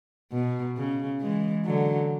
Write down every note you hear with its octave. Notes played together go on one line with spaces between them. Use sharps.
B2
C#3
E3 G#3
D3 F#3